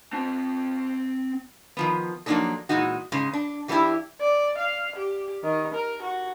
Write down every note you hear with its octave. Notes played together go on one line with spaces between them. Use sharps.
C4 A5
D#3 F3 B3
F3 F#3 A#3 D4 D#4 A4
A#2 E3 G#3 D#4 F#4
G#2 C#3 G#3
D4
E3 G3 B3 D4 E4 G4
D5
F5
G4
D#3
A#4
F#4